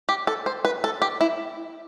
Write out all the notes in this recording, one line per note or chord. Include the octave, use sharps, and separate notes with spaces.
G4
A4
C5
B4
A4
G4
E4